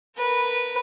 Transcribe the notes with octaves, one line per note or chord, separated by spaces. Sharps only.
A#4 B4